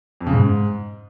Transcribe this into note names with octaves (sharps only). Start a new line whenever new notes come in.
F2
C#3
G#2